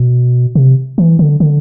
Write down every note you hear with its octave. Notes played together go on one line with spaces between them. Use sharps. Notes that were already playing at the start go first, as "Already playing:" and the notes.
Already playing: B2
C3
E3
D3
D3